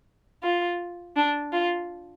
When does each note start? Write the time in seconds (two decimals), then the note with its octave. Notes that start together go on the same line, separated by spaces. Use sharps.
0.43 F4
1.16 D4
1.53 F4